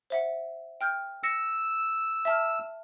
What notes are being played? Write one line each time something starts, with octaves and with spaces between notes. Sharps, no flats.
C5 E5 F#5
G5 F6 G6
E6 A#6 C#7
E5 A5 F6